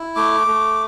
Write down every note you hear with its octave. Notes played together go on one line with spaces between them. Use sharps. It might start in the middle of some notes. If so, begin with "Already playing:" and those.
Already playing: E4
A3 D6
A3